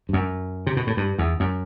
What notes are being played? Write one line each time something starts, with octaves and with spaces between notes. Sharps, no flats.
G2
F#2
C3
B2
A2
G2
E2
F#2